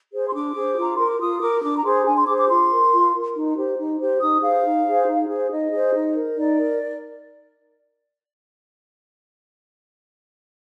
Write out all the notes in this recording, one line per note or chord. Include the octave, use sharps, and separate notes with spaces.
G#4 C5
C6
D4 D6
G#4
C5
F4 A#5
A#4 C6
D6
F4 D#6
A#4 D6
D4 D6
A#5
G#4 C5 C6
D4 G#5
C6
G#4 C5 D6
D6
F4 C6
A#4
F4
A#4
D#4
G4 C5
D#4
G4 C5
D#4 D#6
G#4 C5 F5
D#4
G#4 C5
D#4
G#4 C5
D#4 D#5
G#4 C5
D#4
A#4
D#4 D5
A#4